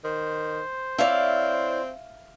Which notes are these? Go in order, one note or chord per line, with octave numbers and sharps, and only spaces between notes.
D#3 C5
C4 E4 C#5 D5 E5 F5